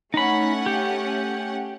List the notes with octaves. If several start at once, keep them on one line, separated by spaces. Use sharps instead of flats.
A3 C#4 D#4 F#5 B5
G4